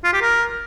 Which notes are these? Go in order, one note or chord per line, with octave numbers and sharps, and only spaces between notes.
F4
G4
A#4